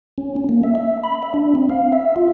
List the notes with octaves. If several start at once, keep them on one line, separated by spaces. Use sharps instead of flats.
C#4
C#4
A#3
E5
E5
B5
E5
D4
C4
F5
E5
F4